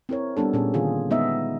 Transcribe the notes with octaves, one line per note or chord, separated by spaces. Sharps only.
C4 E4 A#4 C#5
G3 B3 D4 A4
A#2 C#4 G#4
D3 D#3 F4 G#4
G#3 B3 D#4 D#5 E5